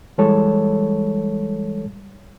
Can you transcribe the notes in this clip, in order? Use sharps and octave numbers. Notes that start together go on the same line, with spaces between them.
E3 G3 G#3 A4 C#5